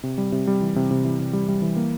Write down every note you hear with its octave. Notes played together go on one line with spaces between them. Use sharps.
C3
G3
C3
G3
E3
C3
C3
E3
C3
G3
G3
E3
A#3